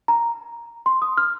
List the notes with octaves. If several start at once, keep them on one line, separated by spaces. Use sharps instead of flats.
A#5
C6
D#6
F6